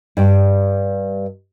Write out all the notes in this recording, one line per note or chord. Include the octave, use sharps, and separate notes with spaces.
G2 D5 G5